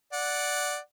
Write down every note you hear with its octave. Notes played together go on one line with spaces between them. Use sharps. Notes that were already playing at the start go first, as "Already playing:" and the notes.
D5 F#5